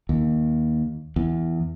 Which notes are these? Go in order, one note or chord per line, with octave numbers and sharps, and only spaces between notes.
D#2
E2